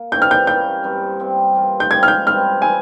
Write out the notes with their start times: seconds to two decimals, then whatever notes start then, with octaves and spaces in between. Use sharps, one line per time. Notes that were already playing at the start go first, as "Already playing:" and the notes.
Already playing: A#3
0.12 C3 E3 G3 C#4 G6
0.22 F6
0.31 G6
0.47 G2 G3 A#3 G6
0.84 G2 G3 C4
1.20 C3 G3 C4
1.55 E3 A#3 F4
1.80 G6
1.91 G#2 G3 C#4 G4 G#6
2.03 F6
2.08 G6
2.27 G2 G3 C4 F6
2.62 E3 G#3 E4 G#5